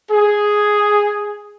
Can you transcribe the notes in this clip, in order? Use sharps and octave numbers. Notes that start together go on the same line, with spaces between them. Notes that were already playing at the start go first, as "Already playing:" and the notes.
G#4